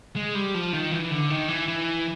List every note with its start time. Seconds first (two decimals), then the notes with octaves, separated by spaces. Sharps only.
0.16 G#3
0.35 G3
0.54 F3
0.73 D#3
0.92 E3
1.11 D3
1.30 D#3
1.48 E3
1.68 E3